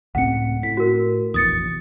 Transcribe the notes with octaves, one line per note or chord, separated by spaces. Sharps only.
C#2 A2 C4 F#5 C#7
A2 B6
F#4 A#4
F1 A#1 E2 D#6 A6 C#7